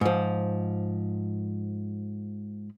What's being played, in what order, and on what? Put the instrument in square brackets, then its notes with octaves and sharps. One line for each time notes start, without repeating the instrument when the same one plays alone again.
[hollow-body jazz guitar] G#2 F3